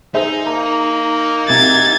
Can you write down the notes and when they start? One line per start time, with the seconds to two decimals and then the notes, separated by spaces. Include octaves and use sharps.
0.14 D#4 G#4 C5 E5
0.47 A#3 A#5
1.48 C2 C3 G#6 A6